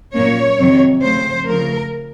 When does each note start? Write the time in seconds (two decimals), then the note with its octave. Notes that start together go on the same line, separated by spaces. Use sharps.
0.13 A#2 F#3 A#3 C#4 C#5
0.58 F2 C3 D#3 F#3 C4
1.01 C#3 F3 A3 C4 C5
1.46 C#3 F3 A3 A#4